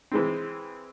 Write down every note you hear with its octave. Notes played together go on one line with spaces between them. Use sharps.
E3 G#3 C4